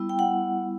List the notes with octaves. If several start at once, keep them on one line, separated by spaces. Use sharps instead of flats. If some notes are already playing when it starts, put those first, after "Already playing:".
Already playing: G3 B3 E4
G5
F#5